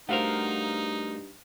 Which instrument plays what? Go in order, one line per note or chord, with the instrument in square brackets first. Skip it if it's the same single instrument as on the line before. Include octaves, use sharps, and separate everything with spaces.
[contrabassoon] G2 [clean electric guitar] A3 F#4 A#4 [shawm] D#4 [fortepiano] C5 F5 F#5